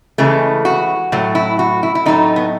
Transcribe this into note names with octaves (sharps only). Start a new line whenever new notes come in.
C#3 E3 G#3 A3
F#4
A2 F#3 A3
E4
F#4
E4
E4
A2 F#3 A3 D#4
B3